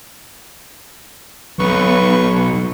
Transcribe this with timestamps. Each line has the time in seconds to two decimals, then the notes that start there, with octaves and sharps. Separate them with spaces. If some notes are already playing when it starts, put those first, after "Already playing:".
1.59 B1 B4 C#6